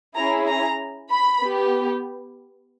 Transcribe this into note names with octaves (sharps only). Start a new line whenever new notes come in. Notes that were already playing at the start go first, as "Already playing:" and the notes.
C#4 E4 G#4 A#5
A#5
B5
B3 G4